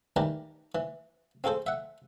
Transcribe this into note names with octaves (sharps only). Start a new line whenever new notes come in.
D#3 E3 G3 G4 A#4 A5
E3
C4 F4 G#4 A4 C5
E5 F#5